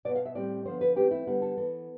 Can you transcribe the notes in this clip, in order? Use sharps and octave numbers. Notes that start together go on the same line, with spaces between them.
B2 B3 D5
F5
E5
A2 G3 C4 D5
D3 F3 B3 C5
B4
E3 A3 C4 G4
E4
D3 G3 B3
A4
E3 B3 A4